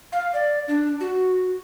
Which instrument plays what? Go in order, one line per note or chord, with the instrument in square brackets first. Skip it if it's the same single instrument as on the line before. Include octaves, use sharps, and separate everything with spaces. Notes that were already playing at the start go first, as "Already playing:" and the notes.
[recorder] F5
D5
D4
F#4